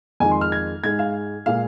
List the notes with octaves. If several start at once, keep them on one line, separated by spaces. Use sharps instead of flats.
F2 D#3 G#3 G#5
C6
F6
G#6
G#2 G#3 G#6
F5
A#2 G#3 F5